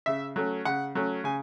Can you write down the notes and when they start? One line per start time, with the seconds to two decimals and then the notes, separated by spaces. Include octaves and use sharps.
0.06 C#3 E5
0.36 F#3 A3 C#4
0.65 C#3 F#5
0.95 F#3 A3 C#4
1.24 C#3 G#5